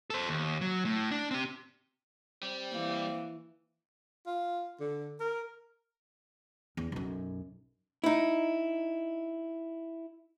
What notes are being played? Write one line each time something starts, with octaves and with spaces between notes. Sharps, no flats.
A4 C5
D#2
F#3
A2
D4
C4 G4
G3 C4
E3 A#3
F4
D3
A#4
E2
B1 F#2
D#4 E4